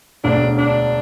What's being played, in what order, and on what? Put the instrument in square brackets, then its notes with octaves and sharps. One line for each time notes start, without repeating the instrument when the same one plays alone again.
[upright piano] E1 D2 D3 [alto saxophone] D4
[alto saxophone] D4